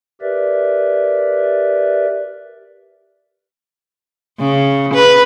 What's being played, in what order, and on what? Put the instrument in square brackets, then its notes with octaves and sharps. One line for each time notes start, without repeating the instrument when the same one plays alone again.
[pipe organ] G4 A#4 B4 D5 E5
[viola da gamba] C#3
B4